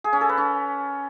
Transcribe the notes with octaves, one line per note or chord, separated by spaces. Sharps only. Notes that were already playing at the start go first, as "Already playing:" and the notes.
G#4
C#4
A4
B4
C#4